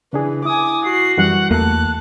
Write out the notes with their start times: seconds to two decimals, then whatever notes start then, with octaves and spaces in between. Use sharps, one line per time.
0.13 C#3 E3 D4 G#4
0.45 E4 G#5 D6 D#6
0.84 F#4 C7
1.18 F#2 E3 G3 F#5
1.51 E2 A3 A#3 A5 F#6